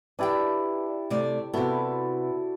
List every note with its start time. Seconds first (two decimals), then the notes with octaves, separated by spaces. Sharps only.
0.19 D4 E4 G4 B4 D5 G5
1.10 C3 A3 D5
1.54 C3 B3 E4 F#4 A4